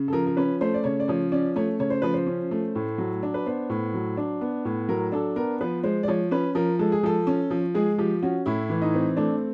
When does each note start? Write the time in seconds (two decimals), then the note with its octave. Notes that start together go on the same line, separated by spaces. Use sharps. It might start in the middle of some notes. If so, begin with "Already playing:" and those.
Already playing: C#3
0.08 A4
0.12 F3 A#4
0.27 A#4
0.37 C#4 B4
0.61 A3 C5
0.74 D5
0.84 C#3 C#5
1.00 D5
1.08 F3 C#5
1.32 C#4 D5
1.56 A3 C#5
1.79 C#3 C#5
1.90 C5
2.02 F3 B4
2.14 C5
2.27 C#4
2.51 A3
2.75 A2
2.98 F#3
3.23 D4
3.34 B4
3.46 B3 C5
3.70 A2
3.94 F#3
4.17 D4
4.41 B3
4.65 A2
4.89 F#3 A#4
5.12 D4 A4
5.36 B3 A#4
5.61 F3 B4
5.84 G#3 C5
6.03 D5
6.08 F3 C#5
6.31 C#4 B4
6.55 F3 A#4
6.79 G#3 A4
6.92 G#4
7.03 F3 A4
7.27 C#4
7.50 F3
7.75 G#3 G#4
7.98 F3 G4
8.23 C#4 F#4
8.46 A2 E4
8.70 E3
8.82 D#4
8.94 C4
9.17 A3 D4